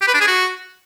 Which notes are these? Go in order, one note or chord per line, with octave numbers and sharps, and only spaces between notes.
G4
B4
D4
G#4
F#4